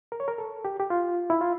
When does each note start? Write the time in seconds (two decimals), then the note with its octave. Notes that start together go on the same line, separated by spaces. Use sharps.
0.12 A#4
0.20 C#5
0.28 A#4
0.38 A4
0.65 G4
0.80 G4
0.90 F4
1.30 E4
1.41 F4